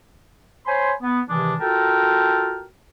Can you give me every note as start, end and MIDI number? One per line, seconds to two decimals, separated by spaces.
0.66 0.91 72
0.66 0.91 73
0.66 0.91 80
0.66 0.91 83
0.66 0.91 84
1.02 1.20 59
1.29 1.54 48
1.29 1.54 51
1.29 1.54 52
1.29 1.54 56
1.29 1.54 62
1.60 2.63 65
1.60 2.63 66
1.60 2.63 69
1.60 2.63 70
1.60 2.63 79
1.60 2.63 81